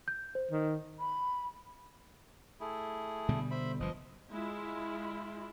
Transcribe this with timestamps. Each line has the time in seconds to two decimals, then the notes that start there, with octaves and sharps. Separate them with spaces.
0.08 G6
0.35 C5
0.51 D#3
0.98 B5
2.60 A3 E4 G#4
3.29 B2 D3 G3
3.51 C5 E5 B5
3.80 F#1 E3 F3 D#5
4.29 G#3 E4 F4